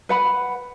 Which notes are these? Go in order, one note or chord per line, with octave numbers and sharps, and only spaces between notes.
B4 F#5 B5